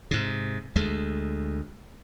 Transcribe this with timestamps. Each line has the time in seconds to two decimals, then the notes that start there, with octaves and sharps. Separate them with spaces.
0.11 G#2 C3
0.76 D2 G#3 A3